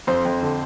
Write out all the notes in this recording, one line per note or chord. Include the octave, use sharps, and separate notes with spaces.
F2 C5
F2
D3